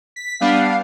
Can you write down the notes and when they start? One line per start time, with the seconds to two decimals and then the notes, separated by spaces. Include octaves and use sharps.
0.16 B6
0.41 G3 B3 D4 F5